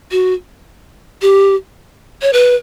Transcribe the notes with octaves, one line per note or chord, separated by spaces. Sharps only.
F#4
G4
C#5
B4